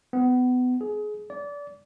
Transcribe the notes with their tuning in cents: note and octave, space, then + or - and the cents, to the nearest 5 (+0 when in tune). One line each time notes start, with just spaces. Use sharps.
B3 +25
G#4 +25
D5 -25